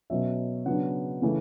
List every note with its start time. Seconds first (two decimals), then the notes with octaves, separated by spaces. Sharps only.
0.10 B2 F#3 C#4 E5
0.66 C#3 F#3 B3 D4 F#5
1.22 C#3 E3 A3